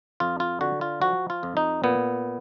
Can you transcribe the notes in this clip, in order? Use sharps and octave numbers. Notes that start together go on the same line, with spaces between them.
F2 F4
F4
D3 F#4
F4
F3 F#4
F4
F2
D#4
A#2 B3